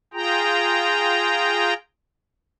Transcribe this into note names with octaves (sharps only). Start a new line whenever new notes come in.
F4 G#4 G5 A#5